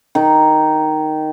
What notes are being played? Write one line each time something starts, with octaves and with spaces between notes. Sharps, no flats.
D#3 D#4